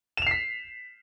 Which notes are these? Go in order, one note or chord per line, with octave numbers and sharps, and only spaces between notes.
B6 C7 E7 F7